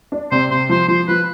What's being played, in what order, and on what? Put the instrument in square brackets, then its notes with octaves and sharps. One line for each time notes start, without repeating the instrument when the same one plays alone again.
[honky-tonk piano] D4
[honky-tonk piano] C3 [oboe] C5
[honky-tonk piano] C3 [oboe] C5
[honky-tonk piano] F3 [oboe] C5
[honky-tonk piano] F3 [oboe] C5
[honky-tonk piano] F3 [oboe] B4